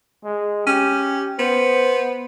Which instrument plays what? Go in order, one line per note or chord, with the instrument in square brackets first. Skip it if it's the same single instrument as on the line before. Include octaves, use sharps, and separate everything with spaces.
[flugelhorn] G#3
[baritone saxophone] C#4 [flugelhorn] G4
[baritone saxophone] B3 [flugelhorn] C5